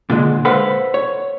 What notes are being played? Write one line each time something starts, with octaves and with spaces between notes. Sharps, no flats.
A#2 D3 G#3
A4 B4 C5 F5 F#5 B5
C#5